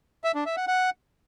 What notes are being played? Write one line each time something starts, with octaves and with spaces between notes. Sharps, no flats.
E5
D4
E5
F#5
F#5